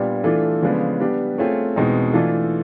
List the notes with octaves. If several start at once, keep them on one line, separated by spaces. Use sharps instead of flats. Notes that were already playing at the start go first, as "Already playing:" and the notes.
Already playing: A#2 G3 B3 D4
E3 A3 D4 F4 A4
C#3 F3 G#3 B3 D4
G3 B3 D4 G4
A3 C4 F4 G#4 C#5
E2 B2 G#3 C4 D#4
E3 A3 D4 F4 A4